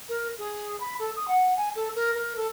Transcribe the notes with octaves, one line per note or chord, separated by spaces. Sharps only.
A#4
G#4
B5
A4
D#6
F#5
G#5
A4
A#4
A#4
A4